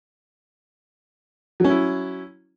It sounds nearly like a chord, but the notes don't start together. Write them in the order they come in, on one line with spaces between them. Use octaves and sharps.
F#3 C#4 E4